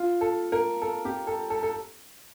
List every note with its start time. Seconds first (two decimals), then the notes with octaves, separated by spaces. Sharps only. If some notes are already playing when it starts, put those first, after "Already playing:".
Already playing: F4
0.21 A4
0.52 A#4
0.82 A4
1.05 G4
1.27 A4
1.50 A4
1.63 A4